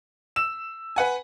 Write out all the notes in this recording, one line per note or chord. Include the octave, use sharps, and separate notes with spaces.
E6 E7
B4 F#5 G#5